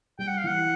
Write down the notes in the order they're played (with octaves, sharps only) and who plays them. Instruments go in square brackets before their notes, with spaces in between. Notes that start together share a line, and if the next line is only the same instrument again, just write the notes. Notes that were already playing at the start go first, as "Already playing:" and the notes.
[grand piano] G3 [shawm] G5
[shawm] F#5
F5
[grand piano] E3 [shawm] F#5